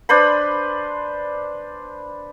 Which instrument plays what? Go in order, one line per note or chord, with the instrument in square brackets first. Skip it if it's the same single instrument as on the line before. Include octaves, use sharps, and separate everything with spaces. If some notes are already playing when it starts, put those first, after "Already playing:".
[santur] D4 B4 C5 B5